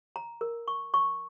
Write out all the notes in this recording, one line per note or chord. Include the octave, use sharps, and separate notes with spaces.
A#5
A#4
C#6
C#6